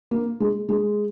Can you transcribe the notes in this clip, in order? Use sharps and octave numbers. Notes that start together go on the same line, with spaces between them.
A#3
G#3
G#3